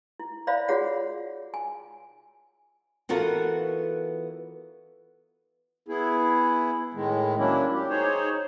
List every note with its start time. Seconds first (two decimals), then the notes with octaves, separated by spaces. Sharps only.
0.20 E4
0.47 C5 D5 E5 F5 B5
0.68 F4 F#4 G#4 C#5 F#5
1.54 G#5
3.09 E3 B3 F4 F#4 A4 A#4
5.88 B3 E4 G#4
6.94 A2 D#3 G#3
7.38 F#3 A#3 C#4 D4 E4
7.73 G4
7.89 D#4 G#4 C5 C#5